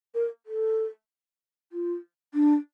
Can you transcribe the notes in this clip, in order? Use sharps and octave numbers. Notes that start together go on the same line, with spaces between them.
A#4
A4
F4
D4